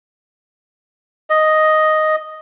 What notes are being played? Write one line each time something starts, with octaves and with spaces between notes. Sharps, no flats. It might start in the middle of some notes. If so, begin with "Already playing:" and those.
D#5